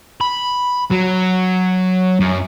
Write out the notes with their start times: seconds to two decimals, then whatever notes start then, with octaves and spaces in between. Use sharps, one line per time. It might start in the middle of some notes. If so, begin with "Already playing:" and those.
0.21 B5
0.91 F#3
2.20 F#2